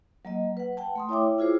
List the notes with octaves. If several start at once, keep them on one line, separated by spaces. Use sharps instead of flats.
F#3 A#3 D#5
B4 F#5
F#5 G5 A5
A3 C6 D#6
E4 C#5 E5 G5 D6
E4 F4 G#4 C5